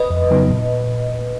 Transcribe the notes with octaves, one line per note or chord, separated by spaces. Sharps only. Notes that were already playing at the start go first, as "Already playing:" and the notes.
Already playing: B4 D#5
F2
C#3 F#3 B3 D#4
A#2